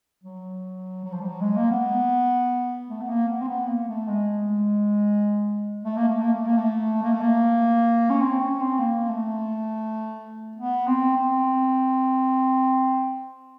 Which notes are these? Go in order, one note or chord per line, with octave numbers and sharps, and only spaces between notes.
F#3
F#3
F3
G3
F#3
G#3
A#3
B3
A3
B3
A#3
B3
C4
B3
A#3
A3
G#3
A3
A#3
A3
A#3
A3
A#3
A3
A#3
A3
A#3
C#4
C4
C#4
C4
A#3
A3
B3
C4
C4